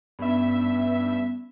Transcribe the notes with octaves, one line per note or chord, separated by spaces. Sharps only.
G2 B3 C#4 E5